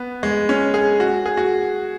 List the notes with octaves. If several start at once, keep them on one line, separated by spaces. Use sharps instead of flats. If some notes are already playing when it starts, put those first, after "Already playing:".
Already playing: B3
G#3
C#4
G#4
F#4
G#4
F#4